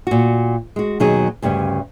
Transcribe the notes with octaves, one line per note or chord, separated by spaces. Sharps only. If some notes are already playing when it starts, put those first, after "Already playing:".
A#2 F#4
G#3 F#4
D#2 B2 F#3 D#4 G#4
D2 G2 C#3 G3 C#4